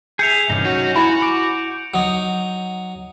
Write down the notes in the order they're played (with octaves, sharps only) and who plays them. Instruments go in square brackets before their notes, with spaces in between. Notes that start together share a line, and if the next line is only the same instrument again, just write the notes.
[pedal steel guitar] G#4 E5 [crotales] G6 C#7 F7
[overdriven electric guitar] C2 G2 [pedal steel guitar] C#4 D#4
[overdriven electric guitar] F#4 C#5
[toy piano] E4 G#5 B5 [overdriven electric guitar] F#4
[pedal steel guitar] D6 [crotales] D7
[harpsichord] F#3 D#4